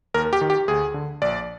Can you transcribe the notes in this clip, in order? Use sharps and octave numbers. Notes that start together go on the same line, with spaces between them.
D#2 A#4
G4
D#3
G4
D2 G#4
D3
A#1 D5